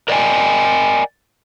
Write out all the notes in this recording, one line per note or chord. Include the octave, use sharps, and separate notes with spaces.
A#4 D5 D#5 F5 G5 G#5